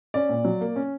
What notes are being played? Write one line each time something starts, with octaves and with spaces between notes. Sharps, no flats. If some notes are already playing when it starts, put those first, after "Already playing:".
C#4 D5
A#2
F#3
A#3
C#4